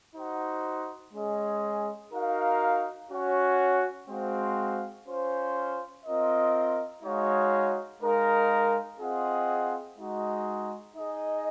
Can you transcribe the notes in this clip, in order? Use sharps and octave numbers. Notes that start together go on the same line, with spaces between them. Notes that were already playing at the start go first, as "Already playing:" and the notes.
D#4 F#4 C5 F#5
G#3 C#4 G#4 D#5
D#4 F#4 A#4 F5
C#4 F#4 C#5 F#5
G#3 C4 F#4 C5 F5
C#4 F4 C5
C4 F4 A#4 D#5
G#3 D#4 F#4 C#5 F5
G#3 D#4 A#4 F5
C4 F4 G#4 D#5 F#5
G#3 D#4 F#4
D#4 G#4 D#5